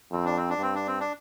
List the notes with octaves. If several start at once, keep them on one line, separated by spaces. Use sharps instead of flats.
F2 C4
D4
C4
D4
G2 C4
D4
C4
D4